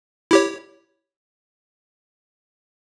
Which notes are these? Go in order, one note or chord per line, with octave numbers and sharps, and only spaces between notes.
E4 G4 C#5